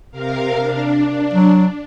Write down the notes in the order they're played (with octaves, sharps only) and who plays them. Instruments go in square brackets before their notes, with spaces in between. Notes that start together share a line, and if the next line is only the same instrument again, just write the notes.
[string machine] C3 A#4 F5
D4
[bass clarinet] F#3